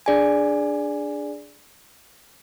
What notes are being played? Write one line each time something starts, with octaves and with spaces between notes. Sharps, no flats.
D4 G#4 D5 G#5